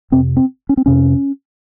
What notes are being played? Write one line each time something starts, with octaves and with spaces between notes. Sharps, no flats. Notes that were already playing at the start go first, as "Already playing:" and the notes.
F2 C3 C4
C4
C#4
C4
F2 C3 C#4